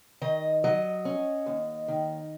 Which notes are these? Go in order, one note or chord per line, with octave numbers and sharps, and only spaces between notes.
D#3 D#5
F#3 D#5
C#4
D#2
D#3